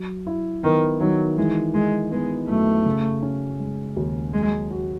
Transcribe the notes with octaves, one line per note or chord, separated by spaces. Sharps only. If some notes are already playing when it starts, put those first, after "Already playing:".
Already playing: F#3
E4
D#3 B3
D#3 F#3
E3 G#3
G#3 D#4
G#3 B3
F#2 A3
C#3
C#4
G#3
D#2
F#3 G#3
F#4